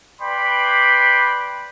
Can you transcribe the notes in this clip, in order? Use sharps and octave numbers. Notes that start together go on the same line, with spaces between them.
B4 D5 G5 B5 C6